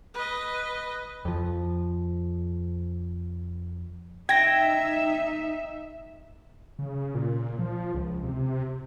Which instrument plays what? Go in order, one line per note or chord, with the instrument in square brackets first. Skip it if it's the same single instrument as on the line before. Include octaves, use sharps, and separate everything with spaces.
[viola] B4 D#5
[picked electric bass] F2 F3
[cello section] D#4 E5 [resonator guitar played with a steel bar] G5 [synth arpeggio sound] G#6 A#6
[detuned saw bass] C#3
A#2
F3
C#2
C3